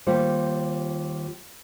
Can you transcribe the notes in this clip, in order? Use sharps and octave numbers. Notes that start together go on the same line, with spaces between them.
D#2 G3 F4 C5 F5